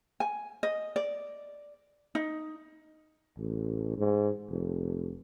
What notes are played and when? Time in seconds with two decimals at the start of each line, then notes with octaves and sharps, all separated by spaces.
0.20 G#5
0.63 D#5
0.96 D5
2.15 D#4
3.38 A1
3.97 G#2
4.50 F1